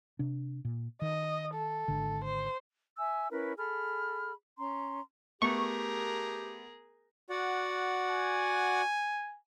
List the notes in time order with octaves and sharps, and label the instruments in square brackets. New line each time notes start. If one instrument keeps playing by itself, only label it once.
[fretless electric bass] C3 D4
A#2
[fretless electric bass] D#3 [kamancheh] D#5
[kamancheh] A4
[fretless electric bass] G#1 D3
[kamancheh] C5
[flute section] E5 G#5 E6
C#4 E4 A#4 B4
G#4 A4 B5 F6
C#4 A#5 C6
[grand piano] A3 B3 [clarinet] G4 [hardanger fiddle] G#4 A#4 [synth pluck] C#6
[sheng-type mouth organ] F#4 D5 F#5
[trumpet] G#5